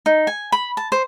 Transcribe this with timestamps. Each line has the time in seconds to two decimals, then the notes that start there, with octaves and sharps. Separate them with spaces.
0.06 D#4
0.27 G#5
0.52 B5
0.77 A5
0.92 C5